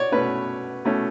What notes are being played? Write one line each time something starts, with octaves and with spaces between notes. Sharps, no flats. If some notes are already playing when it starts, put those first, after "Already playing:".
Already playing: B2 C#5 D5
B2 A3 C#4 B4
B2 A3 C#4